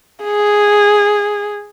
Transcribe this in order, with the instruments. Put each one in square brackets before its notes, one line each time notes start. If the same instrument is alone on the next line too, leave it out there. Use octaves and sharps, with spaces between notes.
[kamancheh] G#4